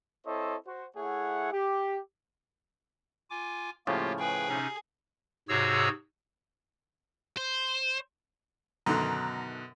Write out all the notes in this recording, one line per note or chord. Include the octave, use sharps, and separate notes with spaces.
C4 E4 A4 C5 C#5 D#5
F#4 C5
A3 E4 G#4 C#5 F#5
G4
F4 G#5 D6
A2 C#3 F3 A#3 F4 G4
G#4 B4 G5
C3 C#4 D#4
G#2 C3 F#4 G#4 C#5 E6
C5
F#2 B2 D3 D#3 A#5 C6